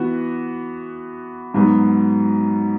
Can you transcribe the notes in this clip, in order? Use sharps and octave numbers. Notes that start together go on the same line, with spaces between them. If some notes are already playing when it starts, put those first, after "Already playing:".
Already playing: E3 B3 F#4
G#2 F#3 B3 F#4